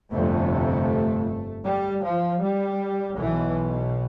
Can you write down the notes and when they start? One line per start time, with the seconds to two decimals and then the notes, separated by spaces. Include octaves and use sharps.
0.12 G1 F2 C3 A3
1.65 G3
2.03 F3
2.41 G3
3.18 B1 B2 E3